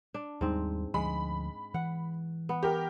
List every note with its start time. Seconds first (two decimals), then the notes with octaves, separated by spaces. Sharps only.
0.14 D4
0.41 D#2 G#2 G3 C4
0.94 D2 F3 G#3 B5
1.74 E3 F#5
2.49 B3
2.63 G4 A#4